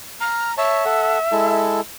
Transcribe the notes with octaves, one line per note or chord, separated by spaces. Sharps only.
A#5 F6
C#5 E5 A5
A4 F#5
G#3 E4 A4